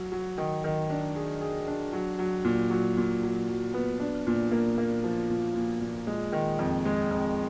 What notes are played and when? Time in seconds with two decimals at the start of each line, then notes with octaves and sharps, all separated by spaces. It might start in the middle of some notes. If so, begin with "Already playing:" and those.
Already playing: F#3
0.12 F#3
0.38 D#3
0.64 D#3
0.90 D4
1.16 G#4
1.41 G#4
1.68 D4
1.93 F#3
2.19 F#3
2.44 A#2
2.70 F#3
2.97 A#2
3.23 F#3
3.49 F#3
3.74 B3
4.00 D4
4.27 A#2
4.52 A#3
4.78 A#3
5.04 F3
5.30 A#2
5.56 A#2
5.81 A#2
6.07 G#3
6.32 D#3
6.59 F2
6.85 G#3
7.11 F2